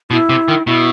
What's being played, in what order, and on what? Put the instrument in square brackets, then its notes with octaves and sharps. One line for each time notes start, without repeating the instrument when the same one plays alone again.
[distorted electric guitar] B2 [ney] E4
[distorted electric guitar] C3
D#3
[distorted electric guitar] B2 [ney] E4